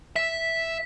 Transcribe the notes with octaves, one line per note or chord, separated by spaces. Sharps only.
E5 B6